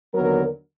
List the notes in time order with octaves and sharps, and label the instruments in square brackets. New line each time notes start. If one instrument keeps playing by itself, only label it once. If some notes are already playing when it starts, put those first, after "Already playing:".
[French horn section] D#2 D3 F#3 B3 A#4